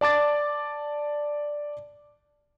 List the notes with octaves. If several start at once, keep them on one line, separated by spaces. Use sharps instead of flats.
D5 A5 D6 A6